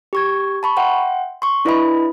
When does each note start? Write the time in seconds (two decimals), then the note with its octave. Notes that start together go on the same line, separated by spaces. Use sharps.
0.13 G4 C#6 G#6
0.63 A5 B5 C#6
0.77 E5 F#5 G5 C6
1.42 C6 C#6
1.65 D4 E4 B4 D#5 E5 B5